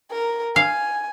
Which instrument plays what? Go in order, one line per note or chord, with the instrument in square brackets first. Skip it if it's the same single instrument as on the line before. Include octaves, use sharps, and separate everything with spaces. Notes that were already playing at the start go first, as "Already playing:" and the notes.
[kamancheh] A#4
[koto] F5 [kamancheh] G#5